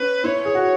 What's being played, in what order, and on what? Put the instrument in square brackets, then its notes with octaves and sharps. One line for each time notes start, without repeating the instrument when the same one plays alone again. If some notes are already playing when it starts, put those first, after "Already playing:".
Already playing: [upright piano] C#4 [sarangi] B4
[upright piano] E4 [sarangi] C#5
[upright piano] G#4
F#4